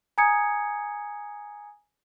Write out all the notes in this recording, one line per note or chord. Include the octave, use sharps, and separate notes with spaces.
G#5 A#5 D#6 G#6 C#7